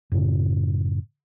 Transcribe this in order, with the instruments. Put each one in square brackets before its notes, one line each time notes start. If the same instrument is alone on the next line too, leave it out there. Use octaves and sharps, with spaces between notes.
[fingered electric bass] F#2 A2 C#3